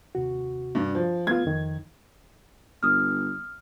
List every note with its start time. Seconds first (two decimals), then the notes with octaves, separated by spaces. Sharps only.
0.15 D#2 C3 F#4
0.75 G2 D4
0.95 F3
1.27 A3 B3 F4 G#6
1.45 F2 D#3
2.83 G1 D#6 F6